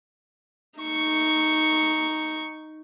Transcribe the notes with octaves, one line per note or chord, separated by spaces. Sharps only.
D#4 C#6